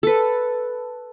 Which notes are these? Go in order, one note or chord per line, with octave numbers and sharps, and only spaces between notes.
A4 B4